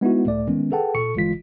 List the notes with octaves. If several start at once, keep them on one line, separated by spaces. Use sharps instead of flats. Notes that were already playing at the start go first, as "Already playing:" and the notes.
G#3 B3 D#4 E4 F#4
C#2 A2 A3 D5
D#3 G#3 B3 C#4
G#4 A4 B4 F#5 G5 A5
A#2 A4 C#6 C#7
G1 E3 G#3 F4 B6